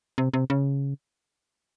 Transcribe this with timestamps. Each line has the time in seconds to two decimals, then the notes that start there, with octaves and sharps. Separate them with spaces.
0.18 C3
0.34 C3
0.50 C#3